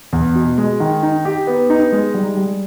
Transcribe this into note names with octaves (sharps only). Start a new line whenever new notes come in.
E2
B2
G#3
D#3
D#4
G4
B3
D#4
G#3
G3
G3